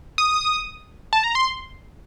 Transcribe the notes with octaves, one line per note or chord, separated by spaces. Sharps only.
D#6
A5
A#5
C6